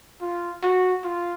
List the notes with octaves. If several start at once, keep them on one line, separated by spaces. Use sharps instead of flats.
F4
F#4
F4